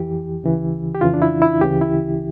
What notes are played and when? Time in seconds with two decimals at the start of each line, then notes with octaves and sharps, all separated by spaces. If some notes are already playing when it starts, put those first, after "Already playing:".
Already playing: F2 E3 G4
0.43 D2 C#3 E3
0.95 G4
1.01 F2 C#3 E3 F4
1.14 D4
1.22 E4
1.42 E4
1.61 D2 C#3 E3 G4
1.81 E4